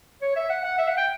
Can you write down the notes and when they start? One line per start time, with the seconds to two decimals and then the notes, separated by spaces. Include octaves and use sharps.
0.22 C#5
0.36 E5
0.50 F#5
0.64 F#5
0.78 E5
0.88 F#5
0.97 G5